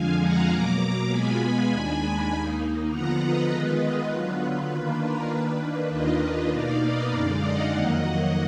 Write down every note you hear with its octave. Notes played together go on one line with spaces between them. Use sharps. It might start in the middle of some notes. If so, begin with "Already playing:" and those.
Already playing: F2 D3 F3 G#3 F5 G#5
F#5 A#5
B2 F#3 A#3 A#5 D6
A#5 D6
B2 G#3 B3 F4 G#5 B5
D#2 D#3 G#3 D4
D#2 D#3 A#3 D#4
D3 F3 B3 F4 F#5 A#5
B4 D#5
D#3 G#3 B3 F4
D3 F#3 B3 F4 B4
D#3 A#3 D4 F4 B4
A#4
D#3 A#3 D4 B4
B4
D#2 D#3 A#3 D4 F4 B4 D#5
B2 A#3 D#4 D5 F5
B4 D#5
F#2 D3 G#3 D#4 D5 F5
D#5 F#5
F2 D#3 F#3 A#3